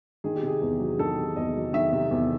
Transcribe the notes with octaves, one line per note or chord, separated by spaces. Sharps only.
D#3 G#4
G4
C3
G#4
E2
F#3
D#3 A4
C3
E2 D#5
F#3
D#3 E5
C3
E2